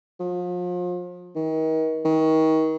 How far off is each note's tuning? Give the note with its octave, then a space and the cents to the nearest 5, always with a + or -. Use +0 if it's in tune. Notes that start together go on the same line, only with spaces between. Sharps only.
F3 +35
D#3 +35
D#3 +30